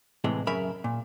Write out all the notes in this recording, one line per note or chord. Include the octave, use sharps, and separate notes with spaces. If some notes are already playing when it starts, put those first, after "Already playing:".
A2 C3 E3 G#3
F#2 C#3 A#4 E5 B5
A#2